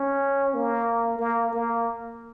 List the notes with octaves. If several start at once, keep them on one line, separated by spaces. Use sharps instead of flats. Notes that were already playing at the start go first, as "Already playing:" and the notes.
Already playing: C#4
A#3
A#3
A#3